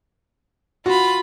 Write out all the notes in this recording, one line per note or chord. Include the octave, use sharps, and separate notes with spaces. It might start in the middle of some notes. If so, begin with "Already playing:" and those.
F4 F#4 B5